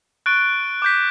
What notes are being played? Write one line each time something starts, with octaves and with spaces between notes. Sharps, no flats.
C#6 F#6 A6 D7 G7
D6 G6 B6